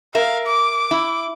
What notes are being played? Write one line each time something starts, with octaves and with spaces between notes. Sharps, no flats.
A#4 E5 F5
D6
E4